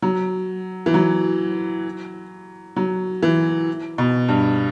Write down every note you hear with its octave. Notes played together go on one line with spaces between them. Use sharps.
F#3
E3
F#3
F#3
E3
B2
G2